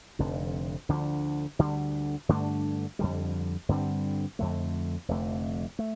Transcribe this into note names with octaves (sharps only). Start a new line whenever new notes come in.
F1 F2 D3
D2 D3 F3 D4
D2 D3 G3
G2 D3 A3 D4
F2 D3 G3
G2 D3 G3 C4
F2 D3 A3
F1 F2 D3 A3
A3